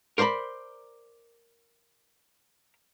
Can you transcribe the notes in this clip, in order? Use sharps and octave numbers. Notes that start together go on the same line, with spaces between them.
A#4 C5 D5 A#5 B5